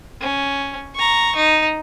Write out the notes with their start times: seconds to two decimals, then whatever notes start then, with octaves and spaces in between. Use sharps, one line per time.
0.21 C#4
0.95 A#5 C#6
1.36 D#4